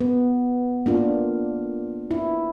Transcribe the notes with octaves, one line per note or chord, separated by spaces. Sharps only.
B3
A#3 D4 F4
E4